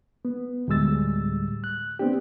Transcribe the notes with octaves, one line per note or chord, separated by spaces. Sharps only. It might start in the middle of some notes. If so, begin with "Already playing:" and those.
B3
D2 A2 G3 G#3 E6 A6
F#6
B3 C4 D4 G4